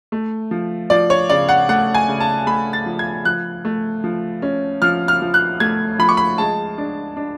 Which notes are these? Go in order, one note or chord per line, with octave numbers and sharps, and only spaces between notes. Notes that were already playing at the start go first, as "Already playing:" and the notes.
A3
F3
F3 D5
C#5
C#3 D5
F#5
A3 F#5
G#5
C#3
A5
A3 B5
A6
F3
G#6
F3 F#6
A3
F3
C#4
F3 F6
F6
F3
F#6
A3 G#6
F3 B5
C#6
B5
G#3 A5
D4
D4